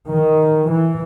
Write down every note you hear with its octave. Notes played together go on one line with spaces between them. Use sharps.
D#3
E3